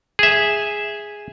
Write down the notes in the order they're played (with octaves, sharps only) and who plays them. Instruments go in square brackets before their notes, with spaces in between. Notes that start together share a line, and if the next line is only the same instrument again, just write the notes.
[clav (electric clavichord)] G#4 E5